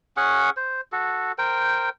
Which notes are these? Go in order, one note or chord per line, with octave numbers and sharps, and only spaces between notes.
C#4 G#4 F#5 C#6
C5
F#4 A4
A#4 C5 G5